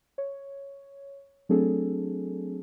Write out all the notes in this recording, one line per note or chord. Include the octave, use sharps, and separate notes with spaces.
C#5
F#3 A3 C4 D4 G#4 A4